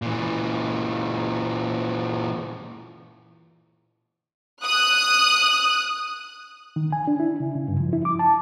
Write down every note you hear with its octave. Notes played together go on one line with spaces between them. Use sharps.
A#2 E3
D#6 F#6
D#3
G#5
D4
E4
C#3
C#3
G2
F3
E4
D6
A5